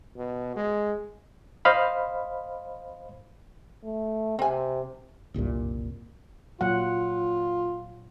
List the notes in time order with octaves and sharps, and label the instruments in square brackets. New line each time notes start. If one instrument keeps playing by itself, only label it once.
[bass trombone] B2
G#3
[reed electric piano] C5 D#5 F5 B5
[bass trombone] A3
[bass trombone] C3 [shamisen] C4 G#5
[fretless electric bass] F#1 C2 G2 A#2
[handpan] A#2 F#3 F#5 [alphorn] F4